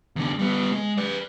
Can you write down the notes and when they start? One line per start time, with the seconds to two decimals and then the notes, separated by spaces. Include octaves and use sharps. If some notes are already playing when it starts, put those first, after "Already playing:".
0.16 E2 D3
0.39 G3 B3
0.72 G#3
0.98 B4 D5